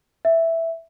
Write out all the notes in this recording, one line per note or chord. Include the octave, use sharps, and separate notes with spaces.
E5